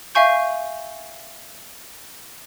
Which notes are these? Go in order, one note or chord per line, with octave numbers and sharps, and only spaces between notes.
E5 F5 G#5 C#6 G6